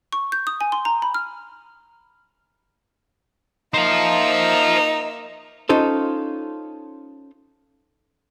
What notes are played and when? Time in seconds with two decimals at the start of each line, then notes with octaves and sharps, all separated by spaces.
0.13 C#6
0.32 G6
0.47 D#6
0.61 G#5
0.72 C6
0.85 A#5
1.02 B5
1.14 F6
3.74 A#3 D#4 C5 E5 F5
5.69 C#4 D#4 F4 A4 C5